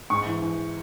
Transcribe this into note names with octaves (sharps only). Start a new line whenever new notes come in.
G#2 C#6
E3
E3